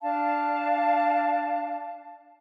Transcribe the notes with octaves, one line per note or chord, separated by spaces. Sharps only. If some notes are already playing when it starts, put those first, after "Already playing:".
D4 F5 A5